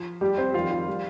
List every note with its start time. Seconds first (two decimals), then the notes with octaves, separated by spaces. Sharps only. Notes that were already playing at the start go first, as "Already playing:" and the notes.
Already playing: F3
0.21 G2 G3 G4
0.38 C4 C5
0.54 F2 D#3 G3 F4 F5
0.71 F4 F5
0.88 G3